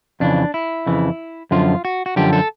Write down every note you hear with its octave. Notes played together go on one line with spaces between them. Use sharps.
F2 C#3 E3 D4
E4
F2 C#3 E3
F#2 D3 F3 F4
F#4
F#4
F#2 D3 F3 G4
A4